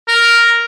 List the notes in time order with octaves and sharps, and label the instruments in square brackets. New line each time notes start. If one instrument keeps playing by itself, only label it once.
[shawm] A#4